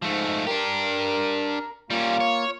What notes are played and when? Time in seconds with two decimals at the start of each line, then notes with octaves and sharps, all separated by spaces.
0.02 G#2 F3 A3
0.47 D4 G4 A#4
1.90 G3 A#3 C#4 F4
2.20 C#5